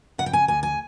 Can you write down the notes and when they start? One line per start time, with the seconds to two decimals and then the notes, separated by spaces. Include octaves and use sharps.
0.18 C#3 F#5
0.26 G5
0.33 G#5
0.48 D2 G#5
0.63 G#5